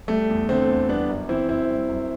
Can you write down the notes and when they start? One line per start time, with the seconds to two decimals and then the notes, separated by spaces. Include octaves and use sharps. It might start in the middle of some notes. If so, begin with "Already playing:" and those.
0.08 G3 A3
0.29 E2
0.49 D3 A3 C4
0.68 E2
0.88 G3 B3 D4
1.09 F#2
1.29 E3 C4 E4
1.49 F#2 C4 E4
1.69 G3
1.89 F#2